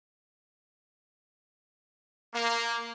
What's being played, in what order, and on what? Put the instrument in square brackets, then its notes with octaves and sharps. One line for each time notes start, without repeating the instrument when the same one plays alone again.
[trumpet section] A#3